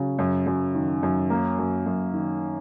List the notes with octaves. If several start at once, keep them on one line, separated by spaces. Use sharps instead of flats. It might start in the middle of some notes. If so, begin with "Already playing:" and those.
Already playing: C#3 F#3
F#2
F#2
D#3
F#2
A#3
F#2
F#2
D#3